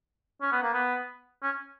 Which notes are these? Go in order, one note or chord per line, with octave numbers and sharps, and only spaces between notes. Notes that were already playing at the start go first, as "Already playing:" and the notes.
C#4
B3
A#3
B3
C#4